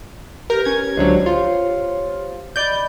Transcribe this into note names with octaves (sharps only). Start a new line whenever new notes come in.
G4 A#4 B4
C#4 G#6
C#2 D3 F#3 C5
F4 G4 C5 C#5
D5 D#5 B5 G6